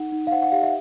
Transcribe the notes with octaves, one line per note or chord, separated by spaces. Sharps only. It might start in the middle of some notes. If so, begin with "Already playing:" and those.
Already playing: D#4 A4 F#5
D#4
F5
C5 F#5
F#5
G4 F5
E5